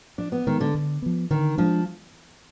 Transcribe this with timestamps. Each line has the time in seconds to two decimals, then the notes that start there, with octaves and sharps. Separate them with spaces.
0.18 F3 D4
0.32 B3
0.47 D#3 G#3 B3
0.61 D3
0.75 D3
1.02 F3 B3
1.30 D3 D#3
1.58 F3 G#3 D4